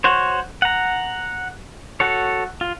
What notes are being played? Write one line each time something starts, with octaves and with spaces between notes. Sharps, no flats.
F#4 C5 C#5
F#5 A#5
F#4 A4 C#5
F4